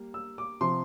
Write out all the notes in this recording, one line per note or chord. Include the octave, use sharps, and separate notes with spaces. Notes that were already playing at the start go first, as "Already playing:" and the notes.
Already playing: G3 A#3
E6
D6
C3 F3 C6